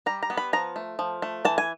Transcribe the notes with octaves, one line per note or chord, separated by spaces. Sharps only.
G3 A#5
A#5
B3
B5
F3 A#5
A3
F3
A3
E3 A5
G#5